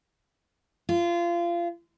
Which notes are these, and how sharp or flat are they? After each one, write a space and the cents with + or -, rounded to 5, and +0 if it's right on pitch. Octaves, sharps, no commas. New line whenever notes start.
F4 -25